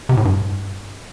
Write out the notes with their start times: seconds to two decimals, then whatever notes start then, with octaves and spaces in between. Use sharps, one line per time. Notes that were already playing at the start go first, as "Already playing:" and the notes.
0.09 C3
0.17 A2
0.25 G2